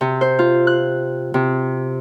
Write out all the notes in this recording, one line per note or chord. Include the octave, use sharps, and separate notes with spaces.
C3
C5
F4
F#6
C3